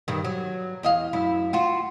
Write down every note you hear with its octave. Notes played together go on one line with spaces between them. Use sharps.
G2 D#3
F#3
E2 D#5 F5
F#2 E4
F4 F#4